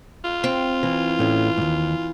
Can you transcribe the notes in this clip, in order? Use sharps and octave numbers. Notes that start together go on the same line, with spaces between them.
F4
C4
E3
A2 A3 C#4
D#2 G#2